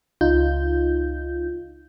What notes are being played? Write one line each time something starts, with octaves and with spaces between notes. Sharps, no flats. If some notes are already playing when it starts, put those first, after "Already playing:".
C#2 D#4 F4 G6